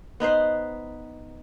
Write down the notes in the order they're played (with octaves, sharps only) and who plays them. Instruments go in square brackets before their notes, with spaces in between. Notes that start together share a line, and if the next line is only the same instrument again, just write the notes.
[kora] B3 D#4 B4 C5